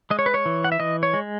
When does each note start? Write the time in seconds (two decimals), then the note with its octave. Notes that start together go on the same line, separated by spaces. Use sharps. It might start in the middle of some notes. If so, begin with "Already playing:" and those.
0.10 G#3 D#5
0.19 C#5
0.26 B4
0.34 C#5
0.46 E3
0.64 F#5
0.72 E5
0.80 E3 D#5
1.03 C#5
1.13 G#3